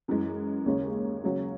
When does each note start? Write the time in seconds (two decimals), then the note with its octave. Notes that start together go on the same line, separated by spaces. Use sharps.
0.08 F#2 E3 G#3
0.66 D#2 C#3 G#3 C#4
1.24 C#3 F#3 C#4